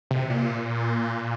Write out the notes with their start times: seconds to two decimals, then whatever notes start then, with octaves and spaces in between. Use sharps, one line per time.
0.11 C3
0.30 A#2